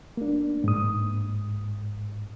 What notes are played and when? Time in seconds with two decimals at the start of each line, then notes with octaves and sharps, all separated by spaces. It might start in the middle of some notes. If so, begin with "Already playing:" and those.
0.17 A#3 D4
0.64 G#2 D#6